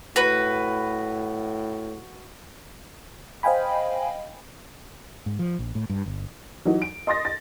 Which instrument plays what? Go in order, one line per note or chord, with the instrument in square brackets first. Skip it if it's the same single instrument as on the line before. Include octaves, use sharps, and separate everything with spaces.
[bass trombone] A2 [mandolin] F#4 B4
[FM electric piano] C5 D#5 F5 G5 G#5 B5
[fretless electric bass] G#2
F3
A#1
A2
G2
G1
[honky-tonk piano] E3 F#3 D#4
D7
D#5 C6 D#6 A6 A#6
A6